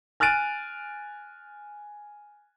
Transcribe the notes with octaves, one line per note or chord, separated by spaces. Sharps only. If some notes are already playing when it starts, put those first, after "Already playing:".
G#5 F6 F#6 A6 D7 D#7